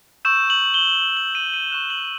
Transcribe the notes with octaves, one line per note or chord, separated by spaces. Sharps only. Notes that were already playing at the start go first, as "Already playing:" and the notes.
C#6 E6 G6 E7
F#7
G7
F#7
D#7
D#7
C#6 F#6 E7
F#7